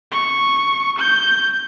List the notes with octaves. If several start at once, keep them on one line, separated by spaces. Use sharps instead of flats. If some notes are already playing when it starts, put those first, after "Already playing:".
C#6
G6